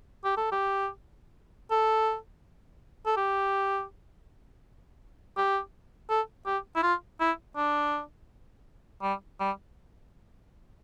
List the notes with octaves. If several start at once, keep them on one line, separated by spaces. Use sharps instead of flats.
G4
A4
G4
A4
A4
G4
G4
A4
G4
E4
F4
E4
D4
G3
G3